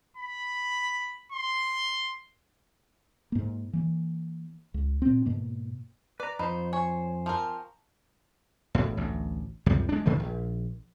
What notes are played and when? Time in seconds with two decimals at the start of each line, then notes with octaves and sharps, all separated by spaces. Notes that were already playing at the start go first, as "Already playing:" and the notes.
0.17 B5
1.32 C6
3.32 G#2 A#3
3.73 E3 A#3
4.74 C#2
5.02 A#2 C4
5.26 G#2 B2 A#3
6.20 B4 D5 A#5
6.39 F2 D#4 C5 B5
6.73 C#5 G#5 C#6
7.26 F3 C4 A#4
8.75 E1 A2
8.97 A1 D2
9.66 C#2 F#2 C3 G3
9.89 G#3 D4
10.06 G#2 D#3 E3 A3
10.20 A#1